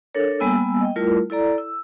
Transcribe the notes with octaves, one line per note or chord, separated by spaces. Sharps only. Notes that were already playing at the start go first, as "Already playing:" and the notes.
D4 A4 A#4 C#5
G3 A#3 B3 G#5 E6
D#5 G5
G3 A3 E4 F4 A#4
E4 A4 D5 A#5
E6